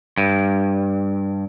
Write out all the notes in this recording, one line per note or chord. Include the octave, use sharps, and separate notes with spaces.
G2